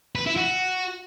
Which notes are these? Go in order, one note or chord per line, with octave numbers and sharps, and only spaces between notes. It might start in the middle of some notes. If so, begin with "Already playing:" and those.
B4
E4
F#4